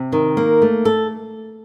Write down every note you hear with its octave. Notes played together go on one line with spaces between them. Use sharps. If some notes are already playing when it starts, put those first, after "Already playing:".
Already playing: C3
D#3
A#3
A3
A4